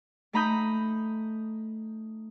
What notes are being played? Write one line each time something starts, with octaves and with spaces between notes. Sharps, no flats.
A3 D#4 A#5 B5 D#6 G6